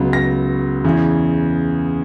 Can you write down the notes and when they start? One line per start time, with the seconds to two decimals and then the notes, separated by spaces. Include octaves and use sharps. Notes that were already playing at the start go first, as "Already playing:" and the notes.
Already playing: C#2 C#3 F#3 B3
0.13 A#6
0.84 E2 C#3 E3